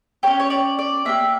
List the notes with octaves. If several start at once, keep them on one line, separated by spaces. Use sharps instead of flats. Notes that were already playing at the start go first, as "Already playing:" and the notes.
C#4 G4 C#5
C#5
D5
D5
A#3 D4 G4 E5